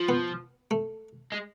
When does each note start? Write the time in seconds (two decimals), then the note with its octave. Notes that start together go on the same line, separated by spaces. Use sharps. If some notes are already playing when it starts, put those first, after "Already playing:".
Already playing: F3
0.09 B3
0.71 A3
1.32 G#3